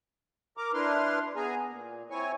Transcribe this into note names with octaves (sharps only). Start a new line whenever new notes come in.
A#4 A#5 D6
D4 E4 B4 C6 F6
B3 G#4 G#5 A#5
A#2
C4 E4 C#5 G#5 C#6